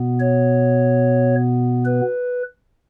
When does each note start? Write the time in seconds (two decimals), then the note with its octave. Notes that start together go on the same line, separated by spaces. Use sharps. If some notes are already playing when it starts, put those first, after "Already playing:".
Already playing: B2 B3
0.20 C#5
1.85 B4